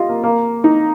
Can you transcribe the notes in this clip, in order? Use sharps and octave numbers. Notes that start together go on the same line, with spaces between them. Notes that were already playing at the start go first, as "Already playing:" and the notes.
Already playing: F4 G4 D#5
A#3
A#3
D#4